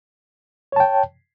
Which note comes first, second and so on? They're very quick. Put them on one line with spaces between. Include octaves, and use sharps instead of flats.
C#5 A5 G5